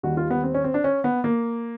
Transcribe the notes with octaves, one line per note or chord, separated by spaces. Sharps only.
D#2 D#3 G3 F#4
F4
B3
C4
C#4
C4
D4
C#4
B3
A#3